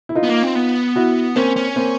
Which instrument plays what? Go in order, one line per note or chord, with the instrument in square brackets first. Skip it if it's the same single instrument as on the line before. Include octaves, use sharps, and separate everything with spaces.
[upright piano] E4
D#4 F4
[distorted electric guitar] B3
A#3
C4
B3
[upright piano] E4 F#4
[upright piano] A#3 C4 [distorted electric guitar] C#4
[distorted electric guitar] C#4
[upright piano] A#3 C4